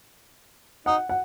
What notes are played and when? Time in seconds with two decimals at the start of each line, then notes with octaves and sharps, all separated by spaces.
0.86 D#4 F#5
1.09 F#5